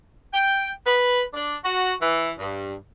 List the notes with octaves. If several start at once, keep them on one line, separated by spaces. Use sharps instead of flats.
G5
B4
D4
F#4
E3
G2